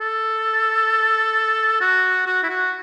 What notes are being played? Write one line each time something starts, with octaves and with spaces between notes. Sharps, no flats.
A4
F#4
F#4
E4
F#4